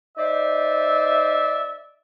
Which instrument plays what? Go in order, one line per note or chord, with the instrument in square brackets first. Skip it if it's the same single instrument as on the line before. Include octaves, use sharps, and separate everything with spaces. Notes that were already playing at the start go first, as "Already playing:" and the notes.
[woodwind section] D#4 C5 D5 E5